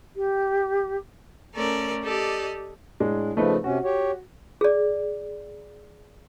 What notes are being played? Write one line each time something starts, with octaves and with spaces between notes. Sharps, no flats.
G4
A3 C#4 A4 A#4 D5
G4 A4 D5 D#5
A2 G#3 D4
C#3 F3 A3 D#4 B4
C3 C#4 F#4
G4 C#5
G#4 D5